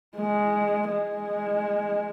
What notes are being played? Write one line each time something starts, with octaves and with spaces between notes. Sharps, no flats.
G#3
G#3